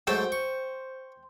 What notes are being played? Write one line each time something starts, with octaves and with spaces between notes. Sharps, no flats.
G#2 F#3 A3 C5 G5
C#6